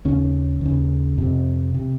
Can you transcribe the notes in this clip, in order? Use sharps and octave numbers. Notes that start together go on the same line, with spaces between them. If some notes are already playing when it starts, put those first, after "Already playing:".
D#2 C#3 C#4
D#2 C#3
F2 C3
C3